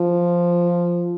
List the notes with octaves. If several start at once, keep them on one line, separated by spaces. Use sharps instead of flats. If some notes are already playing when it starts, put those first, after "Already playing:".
Already playing: F3